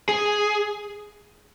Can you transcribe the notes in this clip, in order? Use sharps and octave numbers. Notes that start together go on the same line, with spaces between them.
G#4